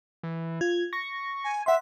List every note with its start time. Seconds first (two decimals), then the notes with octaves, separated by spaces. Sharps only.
0.23 E3
0.61 F4 G#6
0.93 C#6 A#6
1.44 G#5
1.66 E5 F#5 C6